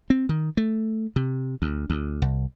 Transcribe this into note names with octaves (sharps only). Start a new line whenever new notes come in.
C4
D#3
A3
C3
D2
D2
C2